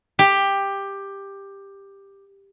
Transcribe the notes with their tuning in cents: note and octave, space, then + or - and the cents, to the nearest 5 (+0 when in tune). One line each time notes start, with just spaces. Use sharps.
G4 +10